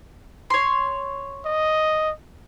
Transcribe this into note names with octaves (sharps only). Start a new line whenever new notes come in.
C#5 C6
D#5